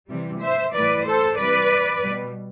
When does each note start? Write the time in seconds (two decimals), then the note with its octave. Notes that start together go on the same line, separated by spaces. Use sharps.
0.09 C3 E3 G3
0.41 C5 E5
0.74 A2 E3 G3 B4 D5
1.06 A4 C5
1.38 C3 E3 G3 B4 D5
2.03 B2 G3